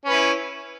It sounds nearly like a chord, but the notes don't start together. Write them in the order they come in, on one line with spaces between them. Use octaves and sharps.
C#4 B4 E4